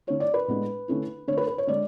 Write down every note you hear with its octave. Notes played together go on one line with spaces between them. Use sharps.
D3 A3 E4 C#5
D5
B4
A2 G#3 B3 D4
D3 A3 C#4 E4
D3 A3 D4 C#5
B4
B4
C#5
D3 G#3 D4 D5